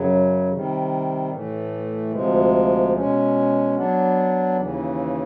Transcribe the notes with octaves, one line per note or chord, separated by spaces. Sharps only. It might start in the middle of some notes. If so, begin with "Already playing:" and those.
Already playing: F#2 C#3 F#3
C3 D#3 G3
A2 E3 A3
D2 C3 F3 G#3
B2 G#3 C#4
F#3 B3 D4
D#2 C#3 E3